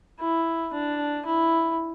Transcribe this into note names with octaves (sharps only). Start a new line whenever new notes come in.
E4
D4
E4